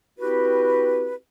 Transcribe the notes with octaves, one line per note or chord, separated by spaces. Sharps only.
C4 E4 F#4 G4 B4